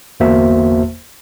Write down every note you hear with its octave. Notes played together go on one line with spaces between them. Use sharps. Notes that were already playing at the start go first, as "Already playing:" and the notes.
G1 E2 A#3 F#4 C5 E5